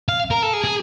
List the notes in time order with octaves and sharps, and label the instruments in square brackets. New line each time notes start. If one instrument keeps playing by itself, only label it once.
[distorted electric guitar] F5
A#4
A4
G#4
G#4